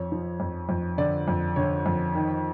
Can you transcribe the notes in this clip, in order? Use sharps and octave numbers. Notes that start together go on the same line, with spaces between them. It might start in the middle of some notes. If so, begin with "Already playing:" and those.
Already playing: F2 C#5
F3
F2
F2
D3 D5
F2
D3 C#5
F2
D#3